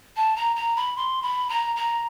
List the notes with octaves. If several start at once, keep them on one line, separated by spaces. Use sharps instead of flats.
A5
A#5
A#5
B5
C6
B5
A#5
A#5